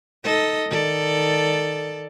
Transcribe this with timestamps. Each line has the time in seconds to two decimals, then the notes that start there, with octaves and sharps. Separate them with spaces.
0.24 D#4 A4 D#5
0.69 D#3 A4 D5